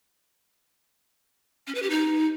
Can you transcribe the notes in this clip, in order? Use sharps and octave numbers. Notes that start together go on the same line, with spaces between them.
C#4
B4
G4
D#4